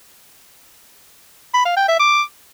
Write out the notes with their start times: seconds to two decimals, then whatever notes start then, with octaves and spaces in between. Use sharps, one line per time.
1.54 B5
1.65 F5
1.77 G5
1.88 E5
1.99 D6